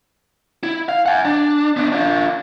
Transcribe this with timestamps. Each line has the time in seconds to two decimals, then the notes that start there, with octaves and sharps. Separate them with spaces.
0.63 E4
0.89 F5
1.06 F#5 G#5
1.25 D4
1.77 B3 D4
1.92 D4 F4